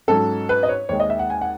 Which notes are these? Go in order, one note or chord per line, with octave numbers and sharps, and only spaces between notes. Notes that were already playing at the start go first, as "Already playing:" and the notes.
G#2 F#3 C#4 A4
B4
D#5
C#5
D#2 D#3 G#3 C#5
D#5
E5
F#5
G#5
F#5